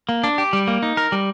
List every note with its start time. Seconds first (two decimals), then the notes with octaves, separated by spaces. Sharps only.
0.09 A#3
0.24 D4
0.38 G4
0.53 G3
0.68 A#3
0.83 D#4
0.97 A#4
1.12 G3